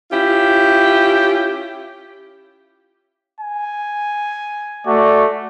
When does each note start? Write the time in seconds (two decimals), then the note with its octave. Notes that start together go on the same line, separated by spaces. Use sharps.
0.11 C#4 E4 F4 G4
3.41 G#5
4.87 A3 F#4 D5